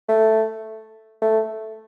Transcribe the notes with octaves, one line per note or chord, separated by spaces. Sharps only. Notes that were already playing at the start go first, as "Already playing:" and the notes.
A3
A3